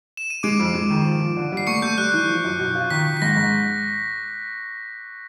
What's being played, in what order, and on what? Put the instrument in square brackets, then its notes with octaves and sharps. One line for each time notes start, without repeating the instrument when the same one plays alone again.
[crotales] E7
D#7
[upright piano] G#3 [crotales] D6 D7
[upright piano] F2
G#3
D#3
F3
F3
D3
G3
[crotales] C7
[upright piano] A3 [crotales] C#6 C#7
[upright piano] A3 [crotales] G6
[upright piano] G3 [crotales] F#6
[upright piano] E3
F3
F#2
B2
F4
[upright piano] D#3 [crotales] B6
[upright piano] D#3
[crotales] B6
[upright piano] G#2 [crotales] A#6
[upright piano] G#2